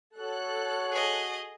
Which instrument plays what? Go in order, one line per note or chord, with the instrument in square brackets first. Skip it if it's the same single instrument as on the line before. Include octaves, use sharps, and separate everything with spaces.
[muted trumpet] F#4 [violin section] A4 F#6 [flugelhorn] C#5
[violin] G#4 D#5